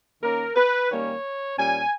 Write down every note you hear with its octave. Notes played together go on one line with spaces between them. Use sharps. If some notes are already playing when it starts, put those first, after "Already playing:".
D#3 A#3 C#4 A#4
B4
D#3 G3 A#3 C#4 C#5
A#2 G3 C#4 G#5